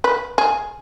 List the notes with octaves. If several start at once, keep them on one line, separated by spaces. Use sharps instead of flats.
B4
G#4